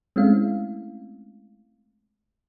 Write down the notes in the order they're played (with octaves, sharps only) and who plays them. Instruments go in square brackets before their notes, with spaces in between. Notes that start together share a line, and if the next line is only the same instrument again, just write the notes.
[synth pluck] G#3 A3 C4 C#4 E4 F5